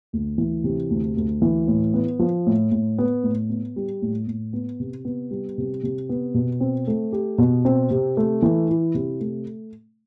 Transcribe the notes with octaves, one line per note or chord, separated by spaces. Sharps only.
D2
E3
C3
D2
D2
E3
A2
B3
F3
A2
A2
B3
A2
B3
G3
A2
A2
B3
C3
B3
G3
C3
C3
B3
B2
C4
A3
G4
B2
C4
C3
A3
E3
E4
C3
A3